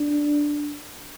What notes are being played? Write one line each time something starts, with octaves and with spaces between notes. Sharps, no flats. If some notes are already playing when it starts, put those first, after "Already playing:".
Already playing: D4